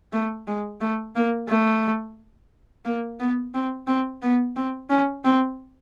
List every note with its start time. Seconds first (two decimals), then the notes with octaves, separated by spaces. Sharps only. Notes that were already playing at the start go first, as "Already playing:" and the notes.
0.13 A3
0.48 G#3
0.81 A3
1.16 A#3
1.49 A3
2.85 A#3
3.20 B3
3.54 C4
3.87 C4
4.23 B3
4.56 C4
4.90 C#4
5.25 C4